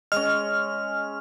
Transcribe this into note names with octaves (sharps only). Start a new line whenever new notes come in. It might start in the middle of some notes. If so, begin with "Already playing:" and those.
G#3 C#4 D#5 F6